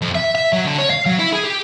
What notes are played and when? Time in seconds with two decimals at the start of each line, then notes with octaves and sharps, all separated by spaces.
0.02 F2
0.15 E5
0.35 E5
0.53 F#3
0.65 D3
0.78 C#5
0.90 F5
1.06 F#3
1.19 E4
1.33 G#4
1.45 G4